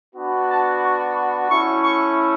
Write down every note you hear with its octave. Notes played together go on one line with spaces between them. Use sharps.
B3 D4 F#4
A5
C#6
C#6
A3 C#4 E4 C#6
C#6